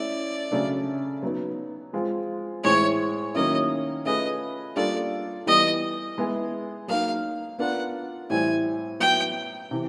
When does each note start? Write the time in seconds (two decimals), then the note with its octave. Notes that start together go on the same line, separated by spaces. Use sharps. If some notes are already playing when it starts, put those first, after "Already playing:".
Already playing: A3 C#4 E4 D5
0.51 C#3 F#3 A3 D4
1.23 F#3 B3 D#4
1.93 F3 G#3 C4 F4
2.63 A2 E3 G#3 C4 E4 C#5
3.35 D#3 F#3 A#3 C#4 E4 D#5
4.05 A3 C#4 F4 G#4 B4 D#5
4.76 G3 A#3 D4 F4 A4 D5
5.46 E3 G3 B3 D#5
6.18 G#3 B3 E4 G#4
6.88 F#3 A#3 D#4 F5
7.58 B3 D4 F4 A#4 F#5
8.30 A2 E3 G3 C4 E4 G#5
9.00 F#3 B3 E4 G5
9.71 C3 E3